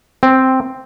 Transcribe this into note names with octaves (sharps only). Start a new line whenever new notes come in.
C4